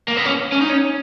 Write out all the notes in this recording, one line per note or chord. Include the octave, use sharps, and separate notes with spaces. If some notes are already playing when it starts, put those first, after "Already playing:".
A#3
B3
C#4
C#4
D#4
C#4